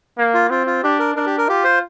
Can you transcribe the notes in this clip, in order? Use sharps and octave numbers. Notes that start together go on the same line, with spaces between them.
A#3
F4
C4 F4
F4
D4 G4
A#4
D4 A#4
G4
A#4
F4 G4
C5